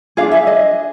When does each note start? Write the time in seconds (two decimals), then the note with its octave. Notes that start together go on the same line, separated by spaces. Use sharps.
0.17 D4 F4 G#4 F5
0.32 E5
0.47 D#5